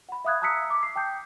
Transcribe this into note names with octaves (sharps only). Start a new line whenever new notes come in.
F#5 B5
E5 F5 D#6 F#6 G#6
A5 A#5 D#6 E6 B6 C#7
D6
C7
G5 A5 D#6 G6